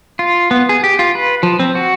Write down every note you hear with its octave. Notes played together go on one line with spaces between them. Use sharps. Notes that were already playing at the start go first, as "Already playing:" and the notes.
F4
B3
G#4
G4
F4
B4
F3
C4
F#4